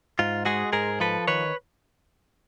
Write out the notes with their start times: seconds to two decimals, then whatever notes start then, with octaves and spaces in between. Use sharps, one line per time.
0.19 G#2 F4
0.45 G#3 F#4 G#4
0.73 G#2 G#4 A#4
1.00 F3 A4 B4
1.28 D#3 B4 C#5